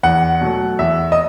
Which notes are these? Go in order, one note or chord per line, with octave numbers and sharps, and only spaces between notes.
E2 F#5
B2 F#3 A3
E2 E5
D#5